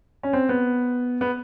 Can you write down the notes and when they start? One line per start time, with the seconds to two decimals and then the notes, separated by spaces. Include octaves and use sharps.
0.23 C#4
0.33 C4
0.49 B3
1.21 B3